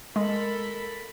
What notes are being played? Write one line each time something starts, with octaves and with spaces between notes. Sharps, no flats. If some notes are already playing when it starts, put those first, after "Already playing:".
G#3 A4 A#4 B5